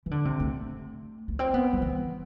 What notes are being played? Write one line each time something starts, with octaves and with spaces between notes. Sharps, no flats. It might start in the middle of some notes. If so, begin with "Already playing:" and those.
E3
D3
C3
A3
B3
C4
B3
F#3
E3